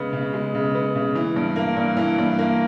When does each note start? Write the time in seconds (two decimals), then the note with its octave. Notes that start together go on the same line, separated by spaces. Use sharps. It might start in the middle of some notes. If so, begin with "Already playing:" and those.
Already playing: C#3 G#3 B3
0.13 C#3
0.34 G#3
0.54 C#3
0.75 B3
0.95 C#3
1.15 E3
1.36 G2
1.56 A#3
1.76 G2
1.97 E3
2.18 G2
2.38 A#3